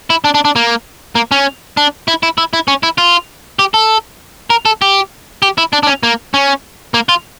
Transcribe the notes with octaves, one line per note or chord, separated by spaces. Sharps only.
E4
D4
D4
D4
A#3
A#3
C#4
D4
E4
E4
E4
E4
C#4
E4
F4
G4
A4
A#4
A4
G4
G4
E4
D4
D4
C#4
A#3
C#4
A#3
F4